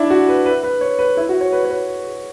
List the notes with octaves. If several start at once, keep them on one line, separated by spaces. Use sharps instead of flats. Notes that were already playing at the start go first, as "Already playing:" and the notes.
Already playing: D4 E4
F#4
B4
B4
B4
C#5
B4
E4
F#4
C#5
B4
C#5
B4